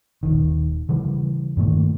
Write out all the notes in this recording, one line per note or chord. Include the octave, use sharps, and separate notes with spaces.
D#1 A#1 D#3
C#3 E3 G3
G2 A#2 D#3 A3